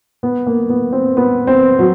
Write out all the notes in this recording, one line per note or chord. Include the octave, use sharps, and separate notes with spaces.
B3
A#3
B3
C4
B3
C4
F#3